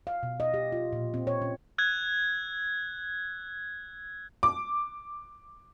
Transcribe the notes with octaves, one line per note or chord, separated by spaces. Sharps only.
F5
B2
D#5
G4
F4
A#2
C4
C#5
C#4
E6 F#6 G#6
D6